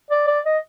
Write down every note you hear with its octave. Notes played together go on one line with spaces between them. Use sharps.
D5
D5
D#5